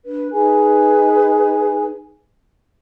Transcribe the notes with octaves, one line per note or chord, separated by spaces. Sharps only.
D4 B4
D#4 G#4 B4 G#5